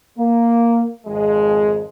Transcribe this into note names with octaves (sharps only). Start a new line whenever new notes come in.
A#3
G#1 F2 G#3